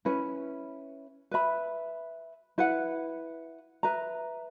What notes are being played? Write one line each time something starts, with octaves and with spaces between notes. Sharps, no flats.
C#4 E4 B4
B4 E5 B5
E4 B4 F#5
B4 E5 A#5